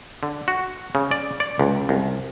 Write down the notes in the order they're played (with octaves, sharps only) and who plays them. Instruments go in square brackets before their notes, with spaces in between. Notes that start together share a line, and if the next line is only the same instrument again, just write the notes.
[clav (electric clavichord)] D3
F#4
C#3
D5
D5
C#2
C2